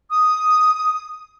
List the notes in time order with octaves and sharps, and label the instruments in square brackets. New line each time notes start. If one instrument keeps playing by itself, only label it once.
[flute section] D#6